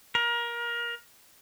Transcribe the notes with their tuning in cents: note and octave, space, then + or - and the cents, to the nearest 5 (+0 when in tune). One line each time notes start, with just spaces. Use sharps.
A#4 +25